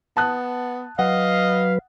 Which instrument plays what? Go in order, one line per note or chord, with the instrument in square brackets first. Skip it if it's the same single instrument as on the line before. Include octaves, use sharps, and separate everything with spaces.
[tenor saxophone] B3 [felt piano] A5 D#6 F#6
[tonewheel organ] F#3 B4 [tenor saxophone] D#5 [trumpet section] F5 [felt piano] F#5